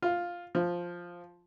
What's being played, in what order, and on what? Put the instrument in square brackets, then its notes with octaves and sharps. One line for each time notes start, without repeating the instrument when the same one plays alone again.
[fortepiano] F4
F3